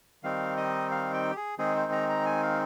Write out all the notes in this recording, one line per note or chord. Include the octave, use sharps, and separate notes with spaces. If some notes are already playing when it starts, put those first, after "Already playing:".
D#3 G3 C4 D#4 F5
D#5
F5
G5
G4
G#4
D#3 G#3 C4 D#4 G#4
C5
A#5
A#5
G#5
F5